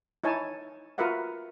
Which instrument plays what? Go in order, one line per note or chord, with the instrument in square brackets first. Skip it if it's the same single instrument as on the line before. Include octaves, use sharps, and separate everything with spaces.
[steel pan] D#4 E4 C#5 G#5 A5
F4 F#4 A#4 B4 E5 F#5